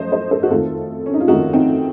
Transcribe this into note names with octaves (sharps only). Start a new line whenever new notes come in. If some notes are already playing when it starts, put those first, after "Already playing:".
Already playing: F#2 F3 A3 C5 D#5
C5 D#5
A4 C5
F#4
F2 D#3 A3 F4 A4
C#4
D#4
F4
F2 D#3 A3 D#4 F#4
C4 D#4